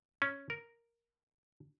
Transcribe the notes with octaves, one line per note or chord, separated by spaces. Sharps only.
C#4
A#4